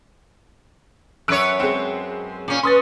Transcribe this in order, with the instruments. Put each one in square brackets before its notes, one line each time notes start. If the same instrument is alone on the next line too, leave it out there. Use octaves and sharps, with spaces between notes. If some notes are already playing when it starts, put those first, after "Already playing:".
[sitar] F#2 B4 C#5 [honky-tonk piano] E6 F#6 D7
[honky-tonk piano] G#3 C4
[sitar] A#2 C#4
[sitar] C#4 [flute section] B4 [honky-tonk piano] C6 D#6 A6